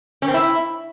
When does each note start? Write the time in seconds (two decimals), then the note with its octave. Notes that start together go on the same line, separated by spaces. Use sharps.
0.22 C#4
0.28 C4
0.34 E4